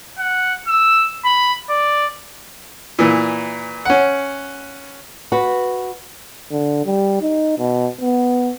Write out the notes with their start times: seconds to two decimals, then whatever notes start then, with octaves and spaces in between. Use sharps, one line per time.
0.19 F#5
0.68 E6
1.25 B5
1.70 D5
2.99 A#2 E3
3.85 C#4 F#5
5.32 F#4 B4
6.51 D3
6.85 G3
7.22 D#4
7.59 B2
8.01 B3